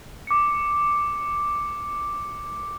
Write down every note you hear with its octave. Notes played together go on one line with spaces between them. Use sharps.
D6 C#7